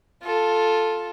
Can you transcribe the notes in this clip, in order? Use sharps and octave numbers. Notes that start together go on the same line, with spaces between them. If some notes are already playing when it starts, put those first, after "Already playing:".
F4 A4